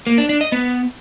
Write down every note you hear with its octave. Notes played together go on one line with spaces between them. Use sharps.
A#3
D4
D4
D#5
B3